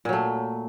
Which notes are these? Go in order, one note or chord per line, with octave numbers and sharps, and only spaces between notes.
A#2 F#3 A3